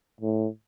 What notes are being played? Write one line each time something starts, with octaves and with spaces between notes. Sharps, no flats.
A2